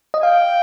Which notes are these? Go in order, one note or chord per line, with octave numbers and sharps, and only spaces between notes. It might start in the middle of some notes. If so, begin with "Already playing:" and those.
D#5
F5 G5